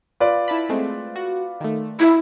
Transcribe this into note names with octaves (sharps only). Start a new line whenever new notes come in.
F4 B4 D5
E4 A5 B5
G#3 A3 C4
F#4
D#3 A3
E4